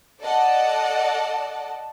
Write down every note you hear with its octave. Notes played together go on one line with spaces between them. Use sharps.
A4 D5 D#5 F#5 A5